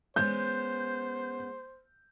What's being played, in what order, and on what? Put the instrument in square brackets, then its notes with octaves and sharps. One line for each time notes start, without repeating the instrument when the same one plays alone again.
[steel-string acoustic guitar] G#3 B3 C#4 [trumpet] C5 [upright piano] G6